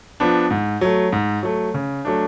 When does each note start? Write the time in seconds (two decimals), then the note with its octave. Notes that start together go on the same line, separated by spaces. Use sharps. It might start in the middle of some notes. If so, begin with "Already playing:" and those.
0.20 F3 B3 D4
0.51 G#2
0.81 F#3 A3
1.13 G#2
1.43 F#3 A3
1.74 C#3
2.05 F#3 A3 D4